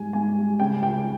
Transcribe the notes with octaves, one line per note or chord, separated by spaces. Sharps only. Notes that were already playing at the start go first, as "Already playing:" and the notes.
Already playing: G#2 G3 G#5
G#2 G#5
G3
C#3 G5
C#2 G5